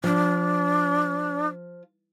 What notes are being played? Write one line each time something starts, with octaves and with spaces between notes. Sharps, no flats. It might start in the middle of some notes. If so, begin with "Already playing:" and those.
F3 D4